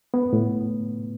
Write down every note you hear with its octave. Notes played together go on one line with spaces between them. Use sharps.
B3
A2